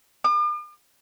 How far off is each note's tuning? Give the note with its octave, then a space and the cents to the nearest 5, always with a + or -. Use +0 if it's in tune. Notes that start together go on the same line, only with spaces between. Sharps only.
D6 +45